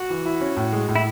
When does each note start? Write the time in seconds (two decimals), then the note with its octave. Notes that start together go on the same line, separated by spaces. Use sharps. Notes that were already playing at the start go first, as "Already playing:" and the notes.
Already playing: F#4
0.10 E3
0.25 E4
0.41 C#4
0.57 A2
0.73 G#3
0.88 A2
0.96 E4